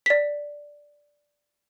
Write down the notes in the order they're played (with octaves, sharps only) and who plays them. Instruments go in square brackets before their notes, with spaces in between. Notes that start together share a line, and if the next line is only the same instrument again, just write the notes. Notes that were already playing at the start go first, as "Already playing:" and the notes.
[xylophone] D5 B6